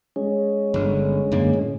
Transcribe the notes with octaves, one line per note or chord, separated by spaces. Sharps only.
G#3 C#4
G1 D3
F#2 D3 A#3
A2